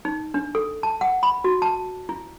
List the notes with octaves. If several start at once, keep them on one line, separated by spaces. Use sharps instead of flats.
D#4
D4
A4
A5
F#5
B5
F#4
A5
E4